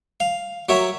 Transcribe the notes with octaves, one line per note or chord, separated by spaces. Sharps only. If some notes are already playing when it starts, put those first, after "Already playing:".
F5
F#3 A#4 C#5 E5